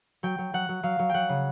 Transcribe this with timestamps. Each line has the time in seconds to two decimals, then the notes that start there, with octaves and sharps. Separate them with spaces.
0.23 F#3 G5
0.38 F#3
0.53 F#3 F#5
0.69 F#3
0.83 F#3 F5
0.99 F#3
1.09 F#3 F#5 G5
1.29 C#3